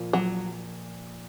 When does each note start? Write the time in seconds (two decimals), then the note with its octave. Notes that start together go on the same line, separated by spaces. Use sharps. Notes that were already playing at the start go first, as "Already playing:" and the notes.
Already playing: A#2 F3 A#3
0.13 F#3